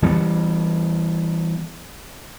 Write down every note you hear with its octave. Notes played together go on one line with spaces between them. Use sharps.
E3 G3 A3 B3